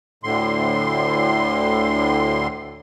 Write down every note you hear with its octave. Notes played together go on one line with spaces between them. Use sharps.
D2 A2 D3 C6